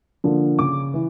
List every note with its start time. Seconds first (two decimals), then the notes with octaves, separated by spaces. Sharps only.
0.24 D3 F3 A#3 D4
0.59 C#3 D6
0.94 E3